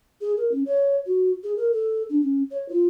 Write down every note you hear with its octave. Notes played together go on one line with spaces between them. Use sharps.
G#4
A#4
C#4
C#5
F#4
G#4
A#4
A4
D4
C#4
C#5
F4